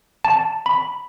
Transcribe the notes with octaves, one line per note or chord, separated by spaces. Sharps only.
A5
B5